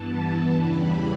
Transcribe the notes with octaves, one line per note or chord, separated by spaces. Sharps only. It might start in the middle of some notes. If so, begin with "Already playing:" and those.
Already playing: G2 E3 B3 A5
A5
E2 C#3 E3 G3 B5